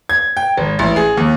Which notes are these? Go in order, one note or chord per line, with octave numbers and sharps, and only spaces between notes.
G#6
G5
G#1
A1
G#4
D#2